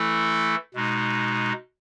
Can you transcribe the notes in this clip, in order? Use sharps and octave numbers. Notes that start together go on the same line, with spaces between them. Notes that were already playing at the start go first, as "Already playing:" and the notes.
Already playing: E3 A3 E4 A4
B2 G#3 D#4